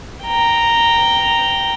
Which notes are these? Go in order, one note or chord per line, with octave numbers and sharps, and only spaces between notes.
G5 A#5